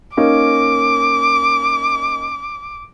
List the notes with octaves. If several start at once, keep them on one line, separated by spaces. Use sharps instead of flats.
A#3 C#4 D#4 D6